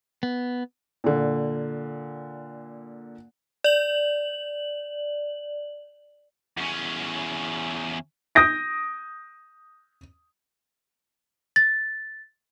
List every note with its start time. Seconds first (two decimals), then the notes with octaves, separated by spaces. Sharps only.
0.23 B3
1.04 A#2 D3
3.64 D5 F#7
6.57 E2 C#4
8.35 D#6 G6 A#6 D7
11.56 A6